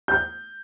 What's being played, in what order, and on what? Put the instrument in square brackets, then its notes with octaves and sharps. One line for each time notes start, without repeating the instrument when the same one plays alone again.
[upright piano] G6